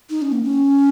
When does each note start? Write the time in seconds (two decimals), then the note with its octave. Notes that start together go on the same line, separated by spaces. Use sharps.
0.10 D#4
0.22 C#4
0.32 A#3
0.44 C#4